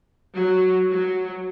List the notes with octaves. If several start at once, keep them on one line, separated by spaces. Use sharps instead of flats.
F#3
F#3